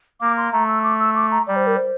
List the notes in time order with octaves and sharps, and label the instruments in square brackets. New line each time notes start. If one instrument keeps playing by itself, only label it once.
[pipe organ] A#3 [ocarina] D6
[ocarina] C6
[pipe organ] A3 [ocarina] A#5
[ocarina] E6
D6
E6
D6
A#5
[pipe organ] G3 [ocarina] D5
[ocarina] C5
A#4
C5